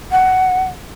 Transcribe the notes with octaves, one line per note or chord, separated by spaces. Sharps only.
F#5